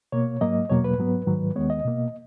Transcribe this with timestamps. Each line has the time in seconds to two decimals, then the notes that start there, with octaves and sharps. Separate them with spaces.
0.12 B2 A#3 C#5
0.41 G#2 F#3 A#3 D#5
0.70 E2 B2 F#3 A#3 C#5
0.84 B4
0.98 G#2 F#3 B3
1.27 G#2 D#3 F#3
1.55 D#2 D#3 G#3 B3 C#5
1.70 D#5
1.84 B2 A#3